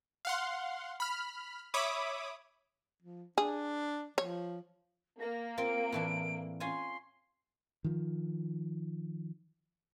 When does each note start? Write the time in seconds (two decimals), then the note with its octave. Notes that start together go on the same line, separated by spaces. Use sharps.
0.25 F5 F#5 C6
1.00 B5 F6
1.74 C#5 E5 B5 D6 D#6
3.03 F3
3.38 D4 G#4
4.18 F3 C#5
5.20 A#3 A#6
5.58 C4 F4 A#4 D7
5.92 A2 E3 D4
6.60 C#4 F4 G#5 C6
7.84 D#3 F3